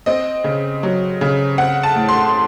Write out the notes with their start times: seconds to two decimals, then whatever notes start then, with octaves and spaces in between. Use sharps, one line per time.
0.06 C4 D#5
0.44 C#3
0.83 F#3
1.21 C#3
1.58 C4 F#5
1.83 A5
1.96 A2
2.08 C6